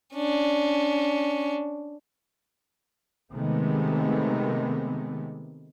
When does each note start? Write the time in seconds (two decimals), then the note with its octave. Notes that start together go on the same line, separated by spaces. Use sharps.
0.15 C#4 D4
3.34 C3 D#3 G#3 A3 B3